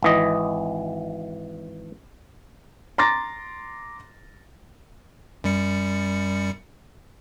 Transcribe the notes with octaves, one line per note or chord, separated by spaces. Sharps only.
G#1 E3 D#5
A#5 C6 D6 A6 A#6
F#2 G3 C#7